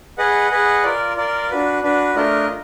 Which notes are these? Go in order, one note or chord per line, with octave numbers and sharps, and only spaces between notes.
G#4 B4 D#5 F#5
G#4 B4 D#5 F#5
F4 A#4 D5
F4 A#4 D5
D4 F#4 B4
D4 F#4 B4
A3 D4 F4 A#4 D#5